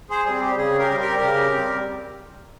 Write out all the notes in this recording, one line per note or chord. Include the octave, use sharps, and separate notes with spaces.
G#4 C5
G3 C4 G#4
G4
C#3 G#4
G4 A#4
G3 C4
G4 A#4
C#3
G3 C4